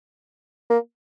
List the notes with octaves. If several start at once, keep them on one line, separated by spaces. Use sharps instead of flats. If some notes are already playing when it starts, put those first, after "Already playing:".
A#3